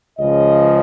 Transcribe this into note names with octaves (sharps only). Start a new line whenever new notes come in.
C#2 C#3 F3 D#5